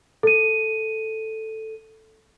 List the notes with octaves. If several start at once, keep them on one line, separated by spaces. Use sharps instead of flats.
A4 D#7